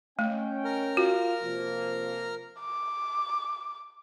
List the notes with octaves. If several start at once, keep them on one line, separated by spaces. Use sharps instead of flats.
A3 C#4 D#5 G5
A#4 A#5 F6
F4 F#4
C3 F3 A#3
D6